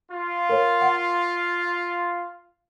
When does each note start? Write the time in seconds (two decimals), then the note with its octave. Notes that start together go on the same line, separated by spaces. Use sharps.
0.11 F4
0.49 A#4 C#5
0.81 F#5